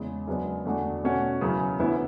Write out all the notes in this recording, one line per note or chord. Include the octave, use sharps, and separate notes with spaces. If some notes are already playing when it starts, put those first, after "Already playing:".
Already playing: E2 C#3 G#3
F#2 C#3 G#3 B3 D4
E2 D3 A3 D4 F#4
B2 A3 C#4 F#4
F#2 C#3 E3
D2 C#3 E3 B3 E4